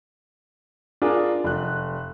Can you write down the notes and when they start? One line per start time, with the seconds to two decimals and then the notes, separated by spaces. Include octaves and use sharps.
1.02 D4 F4 G#4 A#4
1.44 F1 F#6